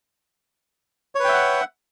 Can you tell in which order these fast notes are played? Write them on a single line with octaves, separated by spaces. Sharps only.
C#5 B4 G5 E5 F#5